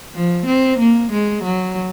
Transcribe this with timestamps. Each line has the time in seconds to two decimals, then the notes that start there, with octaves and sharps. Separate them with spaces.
0.15 F3
0.46 C4
0.79 A#3
1.12 G#3
1.44 F#3